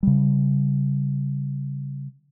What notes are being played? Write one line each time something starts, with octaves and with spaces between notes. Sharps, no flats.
C#3 G3